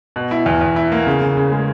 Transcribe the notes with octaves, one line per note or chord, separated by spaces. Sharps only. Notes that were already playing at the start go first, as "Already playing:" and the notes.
B2
E4
E2
E2
E4
A#3
C#3
C#3
C#3
G#3